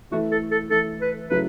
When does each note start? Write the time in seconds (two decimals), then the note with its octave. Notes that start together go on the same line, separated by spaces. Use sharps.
0.11 E3 A3 E4 F#4
0.31 A4
0.51 A4
0.70 E3 A3 E4 A4
1.01 B4
1.30 C#3 F#3 A3 E4 B4